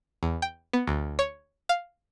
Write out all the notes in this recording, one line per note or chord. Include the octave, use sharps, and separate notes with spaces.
E2
G5
B3
D2
C#5
F5